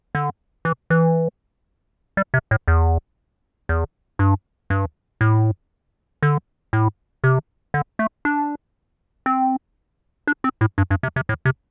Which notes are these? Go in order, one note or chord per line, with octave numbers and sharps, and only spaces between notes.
D3
E3
E3
G3
C3
A2
E2
E2
G2
G2
A2
D3
A2
C3
D3
A3
D4
C4
D4
C4
A2
G2
G2
C3
C3
A2
C3